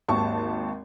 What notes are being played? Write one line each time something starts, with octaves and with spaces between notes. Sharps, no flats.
G#1 D#2 A5 C#6